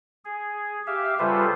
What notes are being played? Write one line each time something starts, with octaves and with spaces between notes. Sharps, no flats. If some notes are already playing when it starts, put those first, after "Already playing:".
G#4
G4 E5 F5
C#3 G3 F4 A4 B4 C5